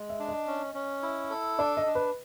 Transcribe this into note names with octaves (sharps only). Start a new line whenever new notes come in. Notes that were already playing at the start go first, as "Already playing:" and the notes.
Already playing: G#3
E5
D4
D#5
C#4
C#4
E4
A4
D4 D5
D#5
D4
B4